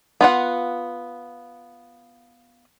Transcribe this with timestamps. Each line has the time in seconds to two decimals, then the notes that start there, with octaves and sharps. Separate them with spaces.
0.21 B3 F4 F#5